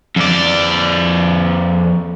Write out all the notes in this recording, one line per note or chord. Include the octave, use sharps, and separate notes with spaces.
F2 D5